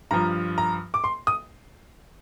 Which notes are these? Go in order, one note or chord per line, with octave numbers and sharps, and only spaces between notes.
G2 F3 A#5
A#5
D6
C6
D#6